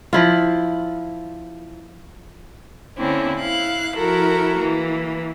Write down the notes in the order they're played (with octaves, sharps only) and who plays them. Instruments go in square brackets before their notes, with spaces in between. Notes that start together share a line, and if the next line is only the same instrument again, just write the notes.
[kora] F3 E4 F4
[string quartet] D3 A#3 C4 C#4 E4
E4 F5 F#6
F3 E4 F#4 A4 A#4
E3 A#3